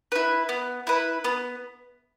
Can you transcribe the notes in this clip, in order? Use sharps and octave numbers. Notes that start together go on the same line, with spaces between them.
E4 B4
B3
E4 B4
B3